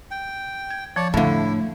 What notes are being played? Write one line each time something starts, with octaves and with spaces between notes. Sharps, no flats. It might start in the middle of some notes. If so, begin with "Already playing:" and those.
G5
G#6
F3 C#5 D5 A5
F2 A2 D3 A3 E4 F5